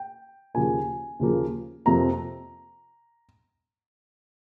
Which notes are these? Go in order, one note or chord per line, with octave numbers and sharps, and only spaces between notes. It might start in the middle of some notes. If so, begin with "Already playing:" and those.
Already playing: G5
D#2 C#3 F3 A#3 G#5
D#2 C#3 F3 A#3
F2 C3 F3 A#3 A#5